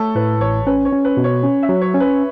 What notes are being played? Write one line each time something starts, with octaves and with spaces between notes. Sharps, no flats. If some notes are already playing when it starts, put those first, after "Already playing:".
Already playing: A3 A4 C#5
A2 B4
A1 C#5
C#4 B4
C#5
C#4
B4
B2
C#5
C#4
E5
F#3
C#5
C#4
B4